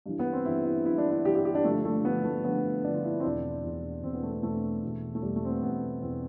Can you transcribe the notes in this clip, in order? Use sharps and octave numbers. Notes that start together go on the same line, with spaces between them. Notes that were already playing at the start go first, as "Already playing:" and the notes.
G2 E3
B3
C4
G2 E3 E4
E4
G2 E3 E4
D4
E4
G2 E3 G4
G4
G4
D4
G2 D3 F3 A3
A3
G2 D3 F3 B3
A3
G2 D3 F3 B3
G2 D3 F3 D4
F4
E4
C4
E2 B2 D4
E2 B2
E2 B2 C4
B3
A3
C4
E2 B2 A3
E2 B2
A3
E2 B2 G3
A3
C4
B3
E2 B2 B3
E2 B2 C4